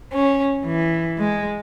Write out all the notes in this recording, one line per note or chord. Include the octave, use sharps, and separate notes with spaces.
C#4
E3
G#3